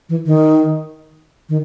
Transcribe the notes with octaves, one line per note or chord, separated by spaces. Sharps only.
E3
D#3
D#3